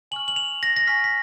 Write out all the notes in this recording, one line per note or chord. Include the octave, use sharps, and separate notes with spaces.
G#5 C#6 F6 F#7
F#7
F7
A#6
A#6
G#5 C#6 F6 B6
B6